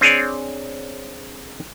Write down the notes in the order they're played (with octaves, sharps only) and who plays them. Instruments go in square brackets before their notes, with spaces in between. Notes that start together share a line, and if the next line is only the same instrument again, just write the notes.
[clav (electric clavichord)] C4 D4 G#4 C#5 D5